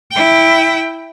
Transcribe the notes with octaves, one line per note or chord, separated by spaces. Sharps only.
E4 G5